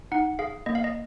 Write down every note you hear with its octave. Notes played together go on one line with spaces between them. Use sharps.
D#4 F#5
G#4 F5
A#3 D#5
F5
D#5